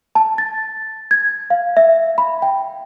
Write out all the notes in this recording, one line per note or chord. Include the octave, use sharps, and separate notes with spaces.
A5
A6
G#6
F5
E5
B5
G5